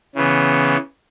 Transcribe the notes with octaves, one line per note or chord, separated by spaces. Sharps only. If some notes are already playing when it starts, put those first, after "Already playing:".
C#3 E3 B3